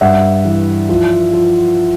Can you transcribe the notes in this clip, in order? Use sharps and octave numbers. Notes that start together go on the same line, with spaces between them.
G2 E5 F#5
E3
F3
F3